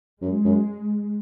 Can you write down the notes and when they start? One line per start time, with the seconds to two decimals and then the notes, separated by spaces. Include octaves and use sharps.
0.21 F#2 G#3
0.45 F#2